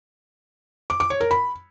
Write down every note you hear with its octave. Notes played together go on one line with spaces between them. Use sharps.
D6
D6
C#5
A#4
B5